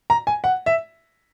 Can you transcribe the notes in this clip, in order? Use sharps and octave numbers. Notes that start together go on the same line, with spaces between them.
A#5
G#5
F#5
E5